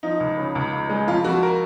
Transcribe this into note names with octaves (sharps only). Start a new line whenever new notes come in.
F3 D#4
C#2
C#3
C#2
C#2
G#3
F2 F4
F2 F#4
A#4